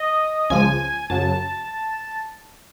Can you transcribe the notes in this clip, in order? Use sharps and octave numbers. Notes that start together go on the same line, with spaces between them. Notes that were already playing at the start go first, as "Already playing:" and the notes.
Already playing: D#5
C#2 C#3 F3 G#5
F#2 C#3 F#3 A5